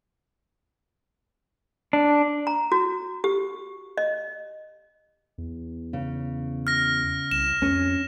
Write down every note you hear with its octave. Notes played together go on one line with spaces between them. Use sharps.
D4
A#5
F#4
G4
D#5
E2
C#3
F6 A#6
C2 E7
F2 C#4